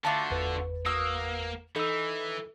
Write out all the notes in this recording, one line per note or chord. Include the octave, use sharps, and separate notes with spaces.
D3 A3 F4 F#4 A5 D6
G1 E2 B4
A#3 F#4 D#6 E6
E3 D#4 A4 E6